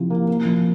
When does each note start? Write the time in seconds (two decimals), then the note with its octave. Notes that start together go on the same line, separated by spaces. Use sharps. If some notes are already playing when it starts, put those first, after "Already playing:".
Already playing: C3 F3 E4
0.10 A#3
0.28 A#3
0.46 F3